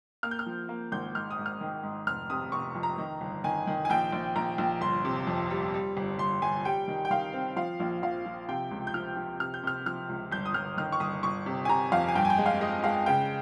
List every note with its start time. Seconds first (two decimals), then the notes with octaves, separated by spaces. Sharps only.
0.23 A#3 F6
0.31 G6
0.39 F6
0.46 F3
0.69 A#3
0.92 G#1 G6
1.14 G#2 F6
1.31 D#6
1.38 G#2
1.46 F6
1.61 D#3
1.83 G#2
2.06 F1 F6
2.30 C3 D#6
2.52 F1 C#6
2.75 F2
2.83 A#5
2.98 D#3
3.21 G1
3.44 D#3 G#5
3.67 D#3
3.85 G#5
3.90 A#1 G5
4.12 A#1
4.36 A#1 A#5
4.58 A#1
4.81 G1 C6
5.05 C3
5.27 F2
5.50 G3
5.74 G3
5.97 G1
6.19 G1 C6
6.42 G1 G#5
6.65 G3 G5
6.88 D#3
7.05 G5
7.11 D#3 F5
7.33 C4
7.56 F3 F5
7.80 A#1
8.02 F3 F5
8.26 F3
8.49 C3 G5
8.71 C#2
8.87 G6
8.94 F3 F6
9.17 F3
9.40 C3 F6
9.54 G6
9.63 C3 F6
9.86 F3 F6
10.09 C#2
10.32 G1 G6
10.46 D#6
10.54 G1 F6
10.77 D#3 F6
10.92 C#6
11.00 G1 D#6
11.23 G1 C#6
11.46 C3
11.65 G#5
11.69 C3 A#5
11.92 F2 F5
12.08 G#5
12.15 G2 G5
12.25 G#5
12.30 G5
12.38 G#3
12.46 F5
12.61 G#3 D#5
12.84 G#3 F5
13.06 C#3 G5